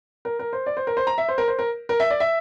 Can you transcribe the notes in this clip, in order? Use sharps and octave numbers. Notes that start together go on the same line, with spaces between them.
A#4
A#4
C5
D5
C5
A#4
C5
A#5
E5
C5
A#4
C5
A#4
A#4
E5
D5
E5